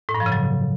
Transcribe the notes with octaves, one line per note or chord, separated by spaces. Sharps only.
A2
G2
F3
C#3
F#3